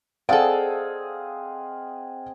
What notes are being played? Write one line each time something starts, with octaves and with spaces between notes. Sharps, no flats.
C4 G#4 A4 D5 D#5 F5 F#5